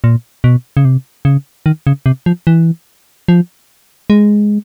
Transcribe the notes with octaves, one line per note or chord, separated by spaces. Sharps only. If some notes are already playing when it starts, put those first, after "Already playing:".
A#2
B2
C#3
C3
C#3
D#3
C#3
C3
F3
E3
F3
G#3